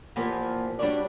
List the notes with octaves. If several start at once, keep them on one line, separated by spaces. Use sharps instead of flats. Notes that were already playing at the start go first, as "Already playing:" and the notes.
A#2 E3 F3 A#3 B3 G4
G3 D4 F#4 B4 C#5 D5